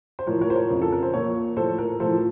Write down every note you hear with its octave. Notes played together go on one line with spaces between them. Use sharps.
C5
A2 F3 A#4 C#5
A#4 C#5
C5
A#4 C#5
F2 C#3 F3
A4
A#4
C5
A#2 F3 A#4 C#5
A2 F3 A4 C5
A#4
A2 F3 A4 C5